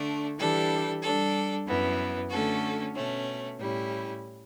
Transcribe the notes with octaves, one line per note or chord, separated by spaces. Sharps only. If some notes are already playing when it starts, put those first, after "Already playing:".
Already playing: D3 A3 D4
E3 G3 D4 A4
G3 D4 A4
F#2 E3 B3
D3 A3 C#4 F#4 A4
B2 A3 C#4
A2 G3 C#4 E4